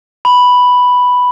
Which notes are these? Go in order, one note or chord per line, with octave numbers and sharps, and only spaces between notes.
B5